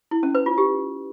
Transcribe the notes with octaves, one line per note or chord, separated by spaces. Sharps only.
E4
C#4
B4
F4
G4